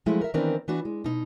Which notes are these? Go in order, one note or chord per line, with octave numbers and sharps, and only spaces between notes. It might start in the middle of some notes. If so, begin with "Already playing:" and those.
F3 F#3 G#3 A3 E4
A#4 E5
D#3 E3 B3 C4 D4 A#4
E3 B3 D4 F#4
G#3
B2 D#4